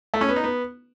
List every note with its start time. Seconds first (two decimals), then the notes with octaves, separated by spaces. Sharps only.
0.14 A3
0.21 C#4
0.29 B3
0.36 D#4
0.44 B3